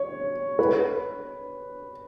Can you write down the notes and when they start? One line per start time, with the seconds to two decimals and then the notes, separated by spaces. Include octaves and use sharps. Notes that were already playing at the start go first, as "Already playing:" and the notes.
Already playing: C#5
0.59 B4